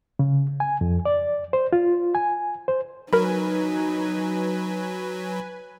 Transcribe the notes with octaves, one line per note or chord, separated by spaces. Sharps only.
C#3
G#5
F2
D5
C5
F4
G#5
C5
F#3 D#4 A#4 B4 G#5 B5